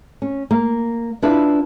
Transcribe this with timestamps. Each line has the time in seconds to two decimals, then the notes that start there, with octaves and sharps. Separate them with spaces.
0.22 C#4
0.51 A#3
1.23 D4 E4 F4 B4 E5 F5